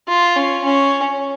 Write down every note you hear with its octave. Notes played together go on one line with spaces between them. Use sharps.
F4
C#4
C#4